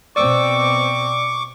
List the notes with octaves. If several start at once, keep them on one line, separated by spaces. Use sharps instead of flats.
B2 C4 D5 C#6 D6 E6 C#7